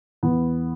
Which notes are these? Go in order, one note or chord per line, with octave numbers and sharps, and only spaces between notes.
E2 B3